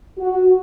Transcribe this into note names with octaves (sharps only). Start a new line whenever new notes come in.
F#4